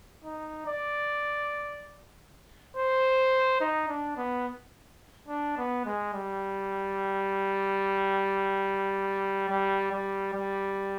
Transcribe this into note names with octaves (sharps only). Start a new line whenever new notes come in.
D#4
D5
C5
D#4
D4
B3
D4
B3
G#3
G3
G3
G3
G3